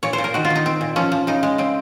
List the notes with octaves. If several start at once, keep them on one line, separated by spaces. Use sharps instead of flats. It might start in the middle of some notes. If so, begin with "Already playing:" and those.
A#2 C#5
C5
A#2
A#4
D#3 F#4
F4
D#3
D#4
C4
A#2
F3 C#4
F3
C#3 D#4
G#3
C#3 C4